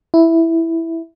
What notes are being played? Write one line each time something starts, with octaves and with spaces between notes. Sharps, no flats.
E4